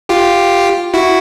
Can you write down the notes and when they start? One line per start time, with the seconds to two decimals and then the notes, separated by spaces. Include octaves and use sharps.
0.09 F4 G4
0.94 E4 F#4